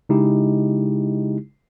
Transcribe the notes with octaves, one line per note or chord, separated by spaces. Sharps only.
C#3 G#3 D#4 E4 G4